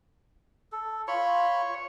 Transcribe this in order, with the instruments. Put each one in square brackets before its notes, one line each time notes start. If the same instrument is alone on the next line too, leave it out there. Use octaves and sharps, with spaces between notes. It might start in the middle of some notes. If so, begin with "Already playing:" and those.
[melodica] A4
[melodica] F4 B5 C6 [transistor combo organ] C#5